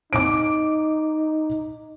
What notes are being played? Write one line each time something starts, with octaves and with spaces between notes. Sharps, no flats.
D#4 D6 D7